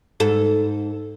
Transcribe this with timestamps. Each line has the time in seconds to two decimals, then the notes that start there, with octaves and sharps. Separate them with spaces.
0.20 G#2 A4